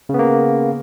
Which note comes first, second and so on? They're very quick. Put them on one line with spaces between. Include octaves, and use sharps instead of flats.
C#3 B3 A#3